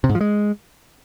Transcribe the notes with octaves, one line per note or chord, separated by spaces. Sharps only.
C3
G#2
F3
G#3